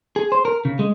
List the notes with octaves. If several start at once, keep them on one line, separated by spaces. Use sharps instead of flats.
G#4
C5
A#4
C#3
G#3